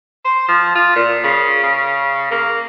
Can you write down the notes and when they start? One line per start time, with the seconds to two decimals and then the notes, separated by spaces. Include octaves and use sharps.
0.25 C5
0.48 F3
0.75 F4
0.96 A#2
1.24 C#3
1.63 C#3
2.31 A#3